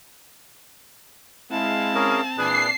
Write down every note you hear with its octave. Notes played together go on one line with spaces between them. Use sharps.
G#3 C4 E4 F5 A5
C#4 G#4 A#4
A#2 E3 D4 G#4 B4 C7